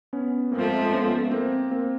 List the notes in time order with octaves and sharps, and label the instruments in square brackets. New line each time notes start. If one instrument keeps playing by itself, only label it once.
[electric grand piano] B3 C#4
[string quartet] G#2 F3 A3 [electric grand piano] A#3 C4
[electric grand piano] B3 C#4
A#3 C4
A#3 C4